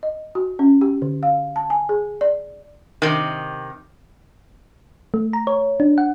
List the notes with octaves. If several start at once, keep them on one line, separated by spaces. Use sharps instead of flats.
D#5
F#4
C#4
G4
D3
F5
A5
G#5
G#4
D5
C3 D#3
A3
A#5
C#5
D4
F#5